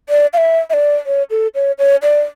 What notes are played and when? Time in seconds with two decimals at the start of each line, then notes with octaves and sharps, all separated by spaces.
0.09 D5
0.33 F5
0.38 E5
0.70 E5
0.73 D5
1.06 C#5
1.31 A4
1.55 C#5
1.79 C#5
2.03 D5